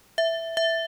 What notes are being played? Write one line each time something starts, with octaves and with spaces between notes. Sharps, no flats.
E5
E5